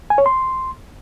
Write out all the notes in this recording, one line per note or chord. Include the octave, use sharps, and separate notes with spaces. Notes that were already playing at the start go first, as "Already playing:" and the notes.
G#5
C#5
C6